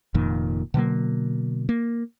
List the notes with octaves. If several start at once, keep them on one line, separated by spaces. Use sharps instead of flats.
F1 F2 A#2 D#3
B2 D3 F#3 A#3
A#3